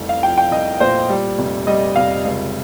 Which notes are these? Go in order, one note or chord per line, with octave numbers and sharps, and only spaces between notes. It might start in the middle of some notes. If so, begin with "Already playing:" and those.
Already playing: F1 C2
F5
F3 G5
G5
C2 D#5
A#2 C5
G3
F1
G3 D#5
F1 F5
C#2